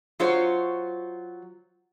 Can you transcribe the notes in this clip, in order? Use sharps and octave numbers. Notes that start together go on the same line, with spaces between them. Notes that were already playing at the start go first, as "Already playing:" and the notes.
F#3 F4 C5 C#5